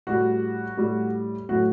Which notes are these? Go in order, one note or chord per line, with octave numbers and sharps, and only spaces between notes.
A2 G3 F#4
A2 G3
A2 F#3 F#4